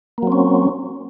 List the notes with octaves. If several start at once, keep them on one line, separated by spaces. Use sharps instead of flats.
F#3 A#3 C4 C#4